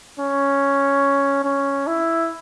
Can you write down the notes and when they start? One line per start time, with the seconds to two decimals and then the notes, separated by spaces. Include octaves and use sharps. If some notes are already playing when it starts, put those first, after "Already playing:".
0.19 C#4
1.44 C#4
1.87 E4